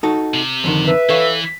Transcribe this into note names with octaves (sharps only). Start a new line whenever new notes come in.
D#4 F#4 A4
C3
F2 D3 D#3
B4 E5
E3 A4 C#5 F5